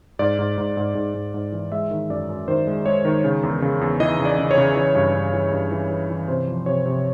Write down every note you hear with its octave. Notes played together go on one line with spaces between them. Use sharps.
G#2 D5
G#2
G#2
G#2
G#2
G#2
G#2
E3
G#3 E5
D#3
F#2 D5
F#2
D#3 C5
G#3
G#3 C#5
D#3
C#3
E2
C#3
E2
E3 D#5
C#3
D5
C#3
C#5
C#3
E3
G2
G2
E3
G2
E3
E3
E3
C3 C5
F3
C3 C#5
C3